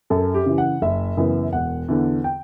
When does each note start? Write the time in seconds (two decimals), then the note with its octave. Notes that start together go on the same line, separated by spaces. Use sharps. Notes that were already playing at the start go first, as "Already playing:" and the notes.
0.10 F#2 A4
0.34 G4
0.46 C#3 E3
0.58 F#5
0.82 F#1 E5
1.17 F#2 C#3 E3 B3
1.53 E1 F#5
1.88 E2 D3
2.24 G5